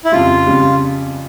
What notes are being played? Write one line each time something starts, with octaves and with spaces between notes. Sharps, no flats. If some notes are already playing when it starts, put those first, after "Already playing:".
E4
F2 C#3 G3 F4
F2 C#3 G3